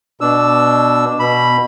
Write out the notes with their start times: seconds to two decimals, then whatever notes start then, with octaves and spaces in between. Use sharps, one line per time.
0.21 B2 D4 E6
1.19 B2 B5